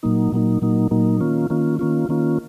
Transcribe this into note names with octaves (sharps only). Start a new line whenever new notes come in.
A#2 F#3 A#3 D#4
A#2 F#3 A#3 D#4
A#2 F#3 A#3 D#4
A#2 F#3 A#3 D#4
D#3 A#3 C#4 F4
D#3 A#3 C#4 F4
D#3 A#3 C#4 F4
D#3 A#3 C#4 F4